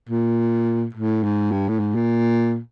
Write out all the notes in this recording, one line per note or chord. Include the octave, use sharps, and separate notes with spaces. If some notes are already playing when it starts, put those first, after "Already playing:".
A#2
A2
G#2
G2
A2
G#2
A#2